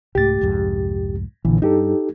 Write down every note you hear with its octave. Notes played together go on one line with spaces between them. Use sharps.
C2 G#2 A3 G4 A6
C2 F2 G#2
A#1 A#2 D3 E3
G2 D#4 G4 A4